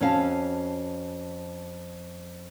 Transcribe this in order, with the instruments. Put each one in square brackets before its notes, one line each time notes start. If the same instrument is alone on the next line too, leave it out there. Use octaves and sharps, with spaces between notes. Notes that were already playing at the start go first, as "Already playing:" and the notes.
[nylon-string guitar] F2 C#4 F#4 F5 A5